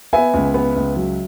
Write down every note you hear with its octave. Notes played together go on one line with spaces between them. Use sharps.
B3 E5 G#5
C#2
B3
C#2
F#3